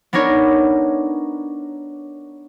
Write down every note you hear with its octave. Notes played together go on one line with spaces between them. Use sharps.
B3 D4 D#4 A#4 C#5